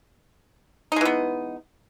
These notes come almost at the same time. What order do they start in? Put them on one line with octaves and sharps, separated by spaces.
D#4 G#3 E3 B3